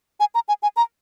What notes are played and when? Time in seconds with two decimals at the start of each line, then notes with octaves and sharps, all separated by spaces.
0.20 G#5
0.35 A#5
0.48 G#5
0.63 G#5
0.76 A#5